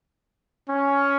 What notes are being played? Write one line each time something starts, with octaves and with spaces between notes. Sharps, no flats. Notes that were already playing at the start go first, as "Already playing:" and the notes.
C#4